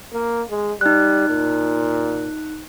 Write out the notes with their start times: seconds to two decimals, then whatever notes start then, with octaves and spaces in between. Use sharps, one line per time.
0.13 A#3
0.50 G#3
0.81 G3 D#4 F#6
1.29 A#2